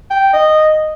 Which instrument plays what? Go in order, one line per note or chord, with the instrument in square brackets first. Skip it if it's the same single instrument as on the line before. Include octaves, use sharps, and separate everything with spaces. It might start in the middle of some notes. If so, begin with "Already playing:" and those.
[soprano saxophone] G5
D#5